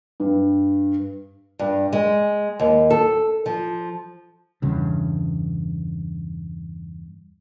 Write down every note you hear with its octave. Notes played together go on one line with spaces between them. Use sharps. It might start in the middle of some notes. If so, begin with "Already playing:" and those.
G2
G2
G#3
D#2
A4
F3
E2 G2 C#3